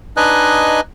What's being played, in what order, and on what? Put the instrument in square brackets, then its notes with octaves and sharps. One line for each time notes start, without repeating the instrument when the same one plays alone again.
[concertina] D4 D#4 B4 D#5 G#5 F#6